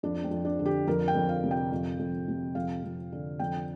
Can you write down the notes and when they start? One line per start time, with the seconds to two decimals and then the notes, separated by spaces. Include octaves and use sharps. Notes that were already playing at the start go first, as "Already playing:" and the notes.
0.03 F2 D4
0.24 C4
0.31 F2
0.45 D4
0.59 D3
0.66 G4
0.87 F2 A#4
1.08 G5
1.15 F2
1.29 F5
1.44 C3
1.51 G5
1.72 F2
1.99 F2
2.28 C3
2.55 F2 F5
2.84 F2
3.12 D3
3.39 F2 G5